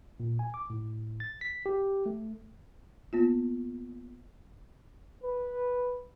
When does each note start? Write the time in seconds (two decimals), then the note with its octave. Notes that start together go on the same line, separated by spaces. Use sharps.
0.20 A#2
0.39 G#5
0.54 D6
0.70 A2
1.20 A6
1.41 B6
1.66 G4
2.06 A3
3.13 A#3 B3 F4
5.23 B4